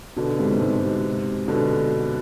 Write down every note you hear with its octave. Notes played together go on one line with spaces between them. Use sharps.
B2 D3
G#2 C3
B2
G#2 C3
B2 D3